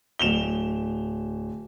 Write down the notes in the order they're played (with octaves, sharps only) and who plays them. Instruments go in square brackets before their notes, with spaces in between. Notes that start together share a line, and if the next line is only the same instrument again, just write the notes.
[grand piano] D1 E7 F7 G7